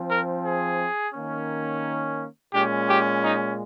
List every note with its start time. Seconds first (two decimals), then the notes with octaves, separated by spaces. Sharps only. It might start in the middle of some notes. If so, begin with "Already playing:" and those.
Already playing: F3 C4
0.11 A#4
0.45 G#4
1.14 D#3 A#3 C#4
2.54 A#2 G#3 C#4 G4
2.89 G4
3.23 D#4